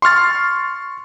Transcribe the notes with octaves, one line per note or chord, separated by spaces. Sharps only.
C6 C#6 F6 A6